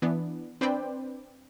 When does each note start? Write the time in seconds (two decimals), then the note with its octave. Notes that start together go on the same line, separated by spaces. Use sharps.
0.02 E3 B3 D4
0.61 C4 D4 B4 C5 D5 G5